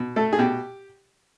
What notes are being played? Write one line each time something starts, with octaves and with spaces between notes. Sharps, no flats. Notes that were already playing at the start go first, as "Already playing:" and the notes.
Already playing: B2
A3 A4
G#4
B2 G4